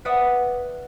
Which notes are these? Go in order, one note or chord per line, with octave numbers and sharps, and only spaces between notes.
B4 D5 E5 F#5 D#6